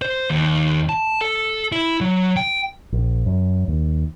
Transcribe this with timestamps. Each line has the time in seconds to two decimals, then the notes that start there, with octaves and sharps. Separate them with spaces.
0.02 C5
0.30 D#2
0.89 A5
1.21 A4
1.72 E4
2.01 F#3
2.37 G5
2.92 A#1
3.26 F#2
3.68 D#2